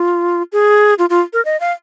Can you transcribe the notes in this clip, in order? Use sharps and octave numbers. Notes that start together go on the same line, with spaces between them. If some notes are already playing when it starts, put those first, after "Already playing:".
Already playing: F4
G#4
F4
F4
A#4
D#5
F5